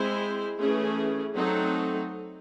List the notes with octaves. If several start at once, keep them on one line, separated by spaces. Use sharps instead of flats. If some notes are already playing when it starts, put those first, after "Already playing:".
Already playing: G#3 C4 E4 C5
E3 A3 C#4 G#4
F#3 A3 C4 D#4 A4